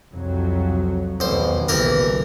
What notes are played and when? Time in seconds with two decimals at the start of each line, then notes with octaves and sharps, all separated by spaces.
0.12 C2 F2 F#3
1.20 A1 E2 B2 D#3 C5
1.69 F#1 B1 B2 E3 G4 A#4